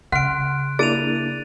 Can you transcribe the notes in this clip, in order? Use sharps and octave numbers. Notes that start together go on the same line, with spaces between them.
C#3 F#5 C6 F6 F#6 D7
A#3 D4 E4 G#4 A6 D#7 F7